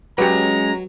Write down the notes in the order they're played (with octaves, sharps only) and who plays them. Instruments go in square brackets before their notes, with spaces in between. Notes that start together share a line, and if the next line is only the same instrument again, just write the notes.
[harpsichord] F#3 [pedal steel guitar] G#3 C#4 [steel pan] G4 B4 [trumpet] A#5